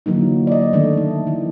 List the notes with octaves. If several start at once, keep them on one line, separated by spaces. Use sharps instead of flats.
D3 E3 F#3 A#3 D#4
D5 D#5
D#3 A3 D4
D#3
E3